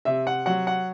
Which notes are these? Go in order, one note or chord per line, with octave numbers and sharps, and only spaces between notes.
C3 E5
F#5
F#3 F#5
F#5